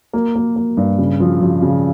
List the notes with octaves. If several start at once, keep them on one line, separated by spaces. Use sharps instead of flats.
A#3
A#3
A#3
G2
C#3
F3
F3
C#3